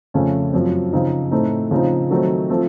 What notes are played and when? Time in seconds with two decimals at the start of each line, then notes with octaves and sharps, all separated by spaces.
0.14 F2 C#3 A3 C#4
0.53 F#2 F3 C4
0.93 C#3 F3 C4 D#4
1.31 A2 A3 C4 D#4
1.71 C#3 F3 C4 D#4
2.10 D#3 F#3 A3 C4 D#4
2.50 F3 A3 C4